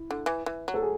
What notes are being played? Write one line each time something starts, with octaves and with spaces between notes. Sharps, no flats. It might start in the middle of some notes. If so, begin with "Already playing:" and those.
Already playing: E4
D3
E3
E3
F#3
A4
G#4